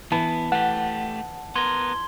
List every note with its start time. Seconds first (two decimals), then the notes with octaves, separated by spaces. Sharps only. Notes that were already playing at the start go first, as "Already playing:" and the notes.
0.12 E3 B3 A5
0.52 A3 G4 F#5
1.56 B3 A#4 C6 G#6 G7